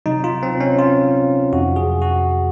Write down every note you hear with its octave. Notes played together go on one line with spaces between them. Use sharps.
C3 F#3 D#4
F4
C4
C#4
F4
F2 C3 F#3 F#4
G#4
F#4